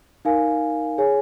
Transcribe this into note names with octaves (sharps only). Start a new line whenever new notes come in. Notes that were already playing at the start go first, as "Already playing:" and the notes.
D#4 A#4 F5 G#5
G#4 C#5 G#5